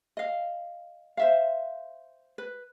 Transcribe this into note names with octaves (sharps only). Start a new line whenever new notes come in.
D#5 F5
C5 E5 F5
B4